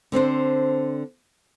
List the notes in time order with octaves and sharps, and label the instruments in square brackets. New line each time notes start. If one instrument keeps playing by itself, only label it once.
[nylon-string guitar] D3 C4 D4 C5